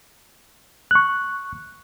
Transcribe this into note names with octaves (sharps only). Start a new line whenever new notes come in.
C#6 F#6